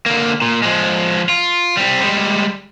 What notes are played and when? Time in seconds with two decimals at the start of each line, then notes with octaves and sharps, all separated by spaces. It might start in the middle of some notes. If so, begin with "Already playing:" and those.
0.06 D3 A#3
0.42 A#2
0.62 F3 G#3
1.29 F4
1.77 G3 C4
2.01 G3 G#3